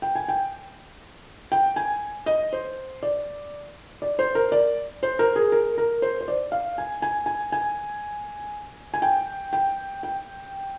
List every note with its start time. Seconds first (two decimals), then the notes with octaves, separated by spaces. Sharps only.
0.02 G5
0.15 G#5
0.28 G5
1.52 G5
1.76 G#5
2.26 D#5
2.53 C5
3.03 D5
4.02 D5
4.19 C5
4.35 A#4
4.52 D5
5.03 C5
5.19 A#4
5.36 G#4
5.52 A#4
5.78 A#4
6.02 C5
6.21 C5
6.28 D5
6.52 F5
6.78 G#5
7.02 G#5
7.26 G#5
7.52 G#5
8.94 G#5
9.02 G5
9.53 G5
10.03 G5